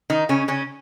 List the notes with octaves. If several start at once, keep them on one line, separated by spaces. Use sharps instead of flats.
D#3 D#4
C#3 C#4
C#3 C#4